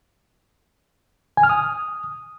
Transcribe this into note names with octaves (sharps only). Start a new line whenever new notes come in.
G#5
F6
D#6